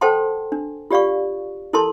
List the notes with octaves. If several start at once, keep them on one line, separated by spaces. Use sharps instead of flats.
A4 C5 F#5 G5 A5 C6
D4
F4 G4 D5 F5 C#6
E4 A4 A#4 A5 C6